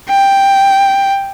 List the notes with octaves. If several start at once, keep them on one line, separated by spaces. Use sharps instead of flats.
G5